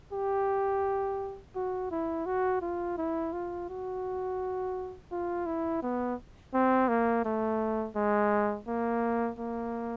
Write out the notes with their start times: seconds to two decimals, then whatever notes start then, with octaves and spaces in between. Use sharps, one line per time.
0.12 G4
1.55 F#4
1.91 E4
2.26 F#4
2.61 F4
2.98 E4
3.33 F4
3.69 F#4
5.11 F4
5.46 E4
5.83 B3
6.54 C4
6.88 A#3
7.25 A3
7.95 G#3
8.67 A#3
9.38 A#3